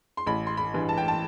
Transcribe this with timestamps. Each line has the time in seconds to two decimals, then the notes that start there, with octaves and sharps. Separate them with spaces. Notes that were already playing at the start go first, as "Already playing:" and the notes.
0.17 C6
0.26 A1 B5
0.47 C6
0.57 B5
0.74 G2 E3
0.89 A5
0.98 G5
1.08 A5